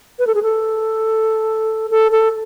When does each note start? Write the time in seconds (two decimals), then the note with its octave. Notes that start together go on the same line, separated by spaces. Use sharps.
0.19 B4
0.27 A4
0.35 G#4
0.43 A4
1.91 A4
2.12 A4